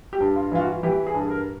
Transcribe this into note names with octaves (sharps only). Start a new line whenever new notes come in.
G4
G2
F4
E3 F4
F#4
E3 G4
G#4
G2
A#4